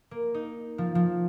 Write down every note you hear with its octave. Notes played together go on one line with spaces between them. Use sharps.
A#3
D#4
F3
F3